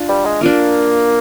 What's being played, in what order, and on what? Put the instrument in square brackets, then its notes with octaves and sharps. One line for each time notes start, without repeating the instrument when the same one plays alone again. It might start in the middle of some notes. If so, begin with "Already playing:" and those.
Already playing: [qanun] D4 F4
[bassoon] G3
G#3
[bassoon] A#3 [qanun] D4 F4 A#4